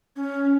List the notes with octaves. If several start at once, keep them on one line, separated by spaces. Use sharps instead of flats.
C#4